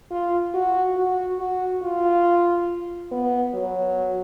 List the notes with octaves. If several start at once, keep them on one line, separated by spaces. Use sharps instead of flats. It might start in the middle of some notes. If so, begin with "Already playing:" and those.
F4
F#4
F#4
F#4
F4
B3
F#3